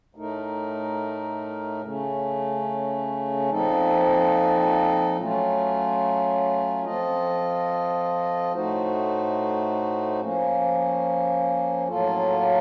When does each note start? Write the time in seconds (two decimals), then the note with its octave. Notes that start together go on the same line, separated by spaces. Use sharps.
0.15 A2 A3 D#4 A#4
1.81 C#3 A3 C#4
3.49 A#2 F3 C4 D#4 A4
5.17 F#3 A3 C#4 F4
6.84 F3 C4 F4 A4 D#5
8.52 A2 A3 D#4 F#4 C5
10.20 F3 A#3 C#4
11.88 A2 F#3 A#3 F4 A4